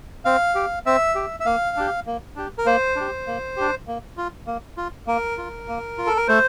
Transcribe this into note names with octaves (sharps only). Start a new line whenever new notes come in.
C4 F5
G4
C4 E5
G4
E5
A#3 F5
D4 G4
A#3
D4 G4
A#4
A#3 C5
D4 G4
A#3
D4 G4
A#3
F4
A#3
F4
A#3 A#4
F4
A#3
F4
A4
A#4
A3 C5